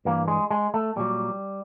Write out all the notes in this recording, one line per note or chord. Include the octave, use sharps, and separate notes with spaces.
G2 E3 G3 A#3
G#3
G#3
A3
A#2 F#3 G3